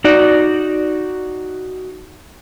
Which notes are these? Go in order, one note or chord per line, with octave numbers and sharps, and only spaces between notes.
D#4 F#4 D5